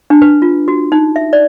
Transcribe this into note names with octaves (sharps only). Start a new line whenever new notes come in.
D4
B4
F4
F#4
D#4
E5
D5